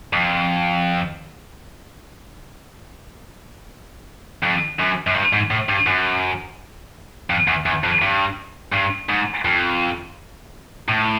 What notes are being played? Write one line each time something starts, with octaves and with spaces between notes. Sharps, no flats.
F2
F2
F#2
F#2
G2
G#2
A2
G2
F#2
F2
E2
E2
F2
G2
G2
G#2
F2
A2